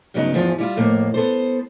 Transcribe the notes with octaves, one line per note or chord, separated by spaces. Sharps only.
G2 C#3 F#3 G#3 B3 D#4
E2 G#2 E3 F3
G3 E4 F4
F2 A2 A#3
B3 A4 C5